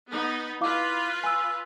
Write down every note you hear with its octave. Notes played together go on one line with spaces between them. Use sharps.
B3 D#4
E4 F4 B4 F5 D6
G#5 E6